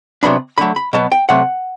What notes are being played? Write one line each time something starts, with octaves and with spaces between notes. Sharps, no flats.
C3 F#3 B3 D4 B5
D3 F#3 A3 B5
B5
B2 F#3 B3 A5
G5
C3 F#3 A3 F#5